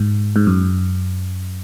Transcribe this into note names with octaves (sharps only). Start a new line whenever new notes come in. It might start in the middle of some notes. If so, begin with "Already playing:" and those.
Already playing: G#2
G#2
F#2